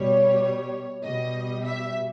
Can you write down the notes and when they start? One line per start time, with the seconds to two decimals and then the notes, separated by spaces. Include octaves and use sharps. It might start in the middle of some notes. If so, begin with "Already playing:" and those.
Already playing: B2 G3 C#5
1.03 B2 G3 D#5
1.65 E5